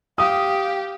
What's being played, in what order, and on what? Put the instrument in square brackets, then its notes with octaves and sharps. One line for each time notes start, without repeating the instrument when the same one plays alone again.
[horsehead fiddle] G4 [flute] F5 [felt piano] D#6